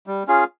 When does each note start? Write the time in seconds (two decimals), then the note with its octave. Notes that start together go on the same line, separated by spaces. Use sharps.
0.07 G3
0.27 C#4 F4 G#4